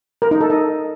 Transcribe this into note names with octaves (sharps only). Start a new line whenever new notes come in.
A#4
D#4
A4
D#5